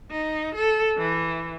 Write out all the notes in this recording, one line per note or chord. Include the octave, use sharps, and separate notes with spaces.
D#4
A4
E3